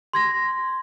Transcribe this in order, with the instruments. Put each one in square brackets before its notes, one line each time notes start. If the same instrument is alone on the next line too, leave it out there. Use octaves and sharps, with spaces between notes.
[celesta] C6 G#6 A#6